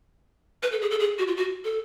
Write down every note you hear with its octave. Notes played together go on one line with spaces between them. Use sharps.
B4
A4
G#4
A4
G#4
F#4
F4
F#4
A4